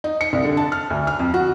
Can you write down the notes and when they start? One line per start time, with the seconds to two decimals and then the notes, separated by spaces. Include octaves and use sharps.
0.04 D#4
0.21 C#7
0.33 C2
0.44 D3
0.57 A5
0.72 F6
0.90 D2
1.07 F6
1.19 F2
1.34 F#4